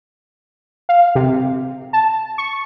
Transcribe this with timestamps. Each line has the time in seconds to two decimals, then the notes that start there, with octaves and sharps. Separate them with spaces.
0.89 F5
1.15 C3
1.93 A5
2.38 C#6